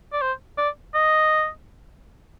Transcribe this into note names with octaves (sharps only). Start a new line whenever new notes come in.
D5
C5
D5
D#5